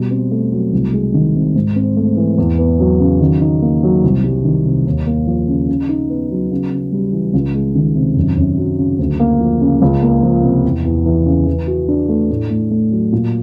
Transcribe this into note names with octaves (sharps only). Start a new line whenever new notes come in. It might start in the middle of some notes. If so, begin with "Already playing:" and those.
Already playing: B2 G3
C4
A3
F#3
C2
G#3
D#3
C3
G#2
C4
A3
E3
E2
B3
F#3
C#3
D#3
D#4
A#3
F#3
C2
G3
D#3
C3
D#2
A#3
F3
C#3
C#3
D#4
B3
F#3
C#3
C#3
G3
E3
C#2
G#3
D#3
C3
F#2
F#2
F#3
C#3
D2
A#3
F3
C#3
C#2
A#3
F3
C3
E2
E2
E3
C#3
E3
F#4
D4
A3
A2
A2
A3
F#3
A#2